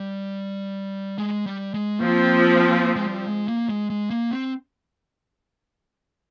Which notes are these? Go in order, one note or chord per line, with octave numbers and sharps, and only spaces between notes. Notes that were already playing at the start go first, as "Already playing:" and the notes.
Already playing: G3
G#3
G3
G#3
F3 A#3 C4 F4
G#3
G3
G#3
A#3
G#3
G#3
A#3
C4